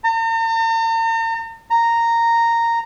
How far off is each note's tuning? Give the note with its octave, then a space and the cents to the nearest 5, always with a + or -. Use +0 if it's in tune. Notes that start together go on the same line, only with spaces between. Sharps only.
A#5 -45
A#5 -10